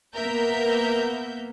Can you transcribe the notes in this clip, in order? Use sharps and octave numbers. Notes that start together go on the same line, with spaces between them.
A#3 B3 A#4 E5 G6